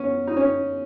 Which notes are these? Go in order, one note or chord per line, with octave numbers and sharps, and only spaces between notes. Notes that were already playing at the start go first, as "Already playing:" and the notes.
Already playing: B3 C#4
D#4
C#4